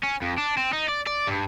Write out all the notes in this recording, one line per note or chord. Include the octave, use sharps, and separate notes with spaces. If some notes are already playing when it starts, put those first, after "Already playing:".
C#4
F2
D4
C4
D#4
D5
D5
G2